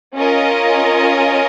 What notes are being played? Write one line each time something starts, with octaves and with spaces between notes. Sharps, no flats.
C#4 F4 A#4 D#5